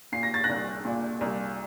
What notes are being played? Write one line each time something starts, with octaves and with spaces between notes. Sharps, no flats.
A#2 C7
A#6
A6
F#6 A#6
C2
A#2
C2